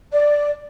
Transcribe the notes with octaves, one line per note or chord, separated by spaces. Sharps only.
D5